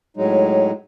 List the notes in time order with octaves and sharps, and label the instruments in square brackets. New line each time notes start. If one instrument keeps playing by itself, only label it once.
[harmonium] A2 F#3 G#3 D#4